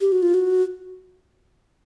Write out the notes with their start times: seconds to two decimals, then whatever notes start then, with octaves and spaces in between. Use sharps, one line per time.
0.01 G4
0.12 F#4
0.23 F4
0.34 F#4